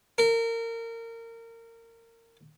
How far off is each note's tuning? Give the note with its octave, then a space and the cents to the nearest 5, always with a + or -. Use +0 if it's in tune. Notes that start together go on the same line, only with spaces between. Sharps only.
A#4 -25